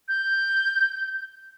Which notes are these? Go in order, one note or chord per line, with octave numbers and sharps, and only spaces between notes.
G6